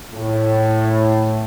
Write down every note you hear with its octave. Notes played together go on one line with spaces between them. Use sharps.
A2